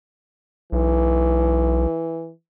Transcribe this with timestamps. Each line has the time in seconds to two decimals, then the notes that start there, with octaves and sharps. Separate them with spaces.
0.72 B1 E3